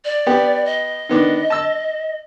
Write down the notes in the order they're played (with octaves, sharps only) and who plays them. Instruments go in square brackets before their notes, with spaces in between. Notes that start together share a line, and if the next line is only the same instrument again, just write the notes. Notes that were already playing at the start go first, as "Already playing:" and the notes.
[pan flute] D5
[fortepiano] B3 G4
[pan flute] D#5
[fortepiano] D#3 B3 D4
A5 E6